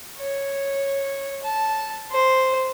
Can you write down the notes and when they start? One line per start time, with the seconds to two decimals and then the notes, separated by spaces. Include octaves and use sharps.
0.19 C#5
1.43 A5
2.11 C5